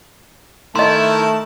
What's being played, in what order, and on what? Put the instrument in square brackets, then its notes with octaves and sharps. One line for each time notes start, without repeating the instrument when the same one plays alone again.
[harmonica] D#3 A#4 A5 [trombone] A3 [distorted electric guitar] E4 [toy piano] D#5 C6